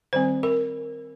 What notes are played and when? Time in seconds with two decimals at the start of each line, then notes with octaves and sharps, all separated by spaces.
0.13 D#3 G3 C4 C5
0.43 A#4